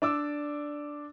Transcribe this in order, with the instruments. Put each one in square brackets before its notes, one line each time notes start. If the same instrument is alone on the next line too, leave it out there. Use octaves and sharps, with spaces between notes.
[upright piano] D4 D5 D6 E6